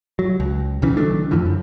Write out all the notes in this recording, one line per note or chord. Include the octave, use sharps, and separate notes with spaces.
F#3
C#2
B1 C#3 E3
D#3 F#3 A3 D4
F2 D3 E3 F3
F#2